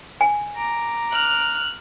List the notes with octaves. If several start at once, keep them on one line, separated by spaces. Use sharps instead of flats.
G#5
A#5 D6
F6 F#6